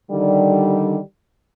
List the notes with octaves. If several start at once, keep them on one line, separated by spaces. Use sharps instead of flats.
D3 D#3 G3